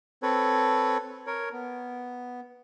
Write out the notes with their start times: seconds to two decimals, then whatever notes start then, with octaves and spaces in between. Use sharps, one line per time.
0.23 C4 A4 B4 C#5
1.27 A#4 C#5
1.53 B3